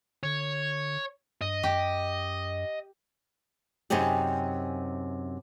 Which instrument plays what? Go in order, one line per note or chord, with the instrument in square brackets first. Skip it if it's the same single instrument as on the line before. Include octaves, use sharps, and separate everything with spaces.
[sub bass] D3 [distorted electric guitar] C#5
[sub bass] G2 [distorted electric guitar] D#5
[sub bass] F#2 [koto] G4
[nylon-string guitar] F#2 C3 D#4 G4 G#4